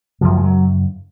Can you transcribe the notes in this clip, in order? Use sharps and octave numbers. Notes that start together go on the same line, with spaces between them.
F#2 C#3 F3
G#3
F#3